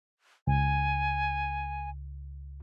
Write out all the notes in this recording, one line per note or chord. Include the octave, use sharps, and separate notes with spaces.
C#2 G#5